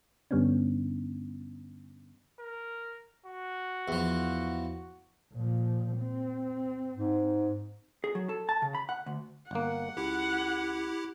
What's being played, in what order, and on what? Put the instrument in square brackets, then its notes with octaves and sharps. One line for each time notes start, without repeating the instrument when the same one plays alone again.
[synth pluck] G2 D3 G3 B3 C#4 D4
[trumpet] A#4
F#4
[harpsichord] E2 F3
[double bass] A#2 F3
C4
[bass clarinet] G#2
[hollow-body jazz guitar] G#4
F#3
A4
A5
C#3
B5
F#5
D2
[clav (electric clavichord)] G1 A#3 [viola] F#5
[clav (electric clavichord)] C#2 [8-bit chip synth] E4 G4